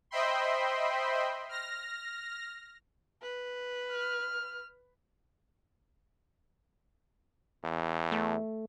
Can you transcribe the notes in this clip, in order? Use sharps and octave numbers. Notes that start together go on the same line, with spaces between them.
C5 D#5 E5 G5 B5 C6
F6 A#6
B4
F6
E2
A3